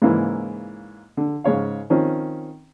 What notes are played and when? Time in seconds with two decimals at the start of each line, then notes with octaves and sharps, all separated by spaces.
0.02 G#2 C#3 E3 A#3 E4
1.17 D3
1.44 G#2 C#3 C#5 F5
1.90 D#3 F3 C4 C#4